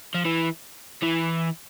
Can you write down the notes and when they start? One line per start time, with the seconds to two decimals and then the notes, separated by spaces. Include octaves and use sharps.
0.15 F3
0.25 E3
1.02 E3